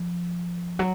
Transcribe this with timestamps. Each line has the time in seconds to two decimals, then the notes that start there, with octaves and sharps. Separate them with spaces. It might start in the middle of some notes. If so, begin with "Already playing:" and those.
Already playing: F3
0.79 F#3